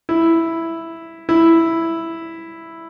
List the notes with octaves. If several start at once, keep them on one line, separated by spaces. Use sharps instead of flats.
E4
E4